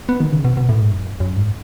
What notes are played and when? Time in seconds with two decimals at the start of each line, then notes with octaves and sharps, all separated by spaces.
0.09 B3
0.20 D#3
0.32 C#3
0.45 B2
0.57 B2
0.69 A2
0.81 G#2
0.92 F#2
1.20 F#2
1.36 G#2